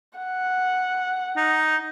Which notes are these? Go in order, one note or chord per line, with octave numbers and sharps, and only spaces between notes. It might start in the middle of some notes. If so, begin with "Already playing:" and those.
F#5
D#4